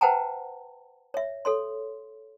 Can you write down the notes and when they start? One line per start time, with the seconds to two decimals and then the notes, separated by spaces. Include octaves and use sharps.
0.01 B4 C5 F#5 G5 A5 A#5
1.14 C#5 E5
1.45 A4 C#5 C6